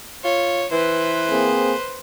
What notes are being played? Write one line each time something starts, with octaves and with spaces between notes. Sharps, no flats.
F4 C#5
E3 B4 C5
A#3 C4 G#4